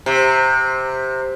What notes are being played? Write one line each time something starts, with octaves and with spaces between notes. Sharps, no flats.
C3